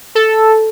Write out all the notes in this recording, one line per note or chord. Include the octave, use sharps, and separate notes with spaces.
A4